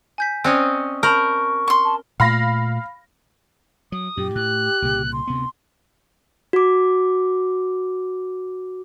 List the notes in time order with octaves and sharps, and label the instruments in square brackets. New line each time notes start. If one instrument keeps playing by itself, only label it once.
[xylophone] G#5 G6 B6
[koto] C4 C#4 D#5 [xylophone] D5 G5 F#6
[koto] A#4 [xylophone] A5 B5 G6 [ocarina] C#6
[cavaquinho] C6 C#6
[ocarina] A5
[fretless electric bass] A#2 A3 [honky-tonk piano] F5 B5 A#6
[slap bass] F#3 [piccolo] D#6
[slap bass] F#2 A#2 [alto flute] G4
[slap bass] A2 [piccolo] F#6
[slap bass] C2 A#2 C#3
[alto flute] C6
[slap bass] D2 C3 B3
[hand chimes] F#4 D6